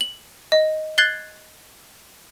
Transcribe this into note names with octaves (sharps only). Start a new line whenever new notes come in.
F#7
D#5
F#6 G#6 A6 C7 F#7 G7